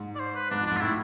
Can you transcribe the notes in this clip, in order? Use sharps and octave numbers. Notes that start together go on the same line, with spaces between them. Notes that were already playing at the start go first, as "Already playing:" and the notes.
Already playing: G#2
D5
C5
B4
G#2 D4
F2
D4
G#2
F4
A2 E4